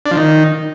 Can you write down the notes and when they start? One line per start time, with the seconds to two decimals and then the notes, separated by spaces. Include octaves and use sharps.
0.06 D4
0.11 F3
0.17 D#3